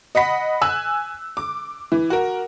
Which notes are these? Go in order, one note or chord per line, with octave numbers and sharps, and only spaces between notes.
D#5 F#5 B5 B6
G#5 E6 F#6
D6
E3
F#4 A#4